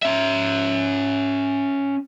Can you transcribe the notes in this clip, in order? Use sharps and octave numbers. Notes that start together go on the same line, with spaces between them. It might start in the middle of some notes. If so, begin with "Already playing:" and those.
C#4 E5